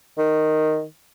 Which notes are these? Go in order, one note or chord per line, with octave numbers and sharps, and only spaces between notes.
D#3